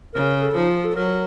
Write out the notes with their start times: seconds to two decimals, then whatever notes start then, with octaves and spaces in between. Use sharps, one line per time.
0.14 C#3 A#4
0.41 A4
0.55 F3 D#4
0.69 F4
0.84 A4
0.96 F#3 A#4